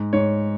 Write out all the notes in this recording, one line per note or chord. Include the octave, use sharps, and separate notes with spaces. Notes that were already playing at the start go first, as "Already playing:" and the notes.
Already playing: G#2
G#2 C#5